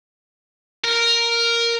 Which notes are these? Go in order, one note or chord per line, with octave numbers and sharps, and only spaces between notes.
A#4